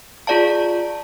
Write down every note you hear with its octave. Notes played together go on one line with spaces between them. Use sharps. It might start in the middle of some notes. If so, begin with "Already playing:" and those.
F4 G#4 D5 F5 A5